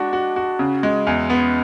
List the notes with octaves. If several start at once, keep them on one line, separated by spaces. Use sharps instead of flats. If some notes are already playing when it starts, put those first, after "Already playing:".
Already playing: G#3 D4 F#4
F#4
F#4
C#3
G#3
E2
B3